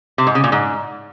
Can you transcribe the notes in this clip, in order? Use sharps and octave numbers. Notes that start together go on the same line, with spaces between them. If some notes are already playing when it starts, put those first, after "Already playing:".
C3
G#2
C#3
A#2
G#2